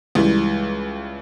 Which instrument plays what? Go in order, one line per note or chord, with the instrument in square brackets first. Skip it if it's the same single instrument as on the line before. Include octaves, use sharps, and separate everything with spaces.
[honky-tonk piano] C#2 E3 G3